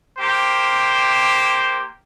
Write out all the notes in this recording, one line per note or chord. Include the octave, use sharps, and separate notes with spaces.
A#3 G4 C5